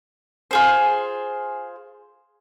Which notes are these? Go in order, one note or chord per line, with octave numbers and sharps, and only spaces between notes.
F4 G#4 C5